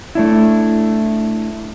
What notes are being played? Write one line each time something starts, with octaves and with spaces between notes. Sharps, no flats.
A3 D4 E4